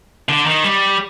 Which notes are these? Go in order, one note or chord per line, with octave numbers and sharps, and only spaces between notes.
D3
D#3
G3